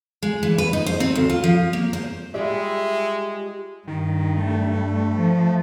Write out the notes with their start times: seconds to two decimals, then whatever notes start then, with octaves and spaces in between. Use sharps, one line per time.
0.23 G#3
0.43 E3
0.58 B4
0.73 D#4
0.86 C5
1.00 C4
1.15 D2
1.30 F4
1.44 F3
1.73 A#3
1.93 C5
2.34 G3 G#3 F4 G4 D5 E5
3.88 G2 D#3
4.37 A3
5.13 F3